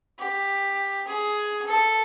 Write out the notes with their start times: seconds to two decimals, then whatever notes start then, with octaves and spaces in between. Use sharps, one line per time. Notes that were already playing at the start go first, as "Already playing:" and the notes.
0.19 G4
1.08 G#4
1.67 A4